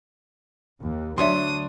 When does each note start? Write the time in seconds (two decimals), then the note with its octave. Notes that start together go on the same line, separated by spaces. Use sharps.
0.82 D#2
1.18 D2 F#3 D4 C#5 E5 C6 D#6